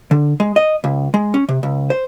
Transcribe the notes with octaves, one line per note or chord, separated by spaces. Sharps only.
D3
G#3
D#5
C#2
G#3
C#4
C3
C#2
C5